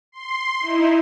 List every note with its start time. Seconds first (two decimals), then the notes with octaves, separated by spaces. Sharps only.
0.12 C6
0.61 D#4 E4